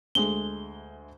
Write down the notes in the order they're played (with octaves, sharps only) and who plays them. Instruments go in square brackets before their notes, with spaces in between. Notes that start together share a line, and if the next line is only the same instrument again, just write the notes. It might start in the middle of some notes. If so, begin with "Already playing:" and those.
[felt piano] D2 G#3 A3 [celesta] G7